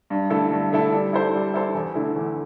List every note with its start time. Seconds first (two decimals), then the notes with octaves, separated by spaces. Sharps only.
0.10 G2
0.30 D3 A3 E4 A4
0.51 G2
0.72 D3 A3 E4 A4
0.92 G3
1.13 E4 A4 C5
1.33 G3
1.54 E4 A4 C5
1.74 E2
1.95 D3 A3 E4
2.16 E2